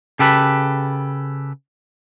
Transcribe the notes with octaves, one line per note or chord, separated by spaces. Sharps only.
C#3 G4 A4 B4